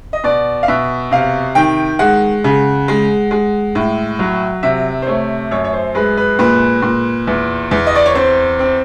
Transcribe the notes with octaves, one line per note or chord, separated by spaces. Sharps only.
D#5
B2 D5
F5
B2 E5
C3 F5
D#3 G5
G#3 F#5
C#3
G#3
G#3
A2
F#3
C3 E5
C5
A3 C#5
F#2 C#5
C#5
C5
G#3 B4
B4
A#2 B4
A#2
E2
E2
D#5
D5
C#5
C4 C5
C4